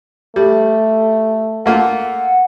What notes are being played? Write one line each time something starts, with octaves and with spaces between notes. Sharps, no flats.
G3 A3
A3 A#3 F4 F#5